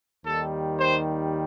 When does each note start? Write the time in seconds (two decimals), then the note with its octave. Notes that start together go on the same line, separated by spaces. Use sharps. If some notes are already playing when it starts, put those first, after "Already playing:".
0.23 D#2 D#3 G3 A4
0.78 C5